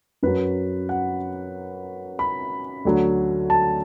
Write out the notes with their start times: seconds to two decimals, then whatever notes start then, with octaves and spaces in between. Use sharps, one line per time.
0.23 F#2 F#3 B4
0.89 F#5
2.19 B5
2.85 D2 D3 F#3
3.50 A5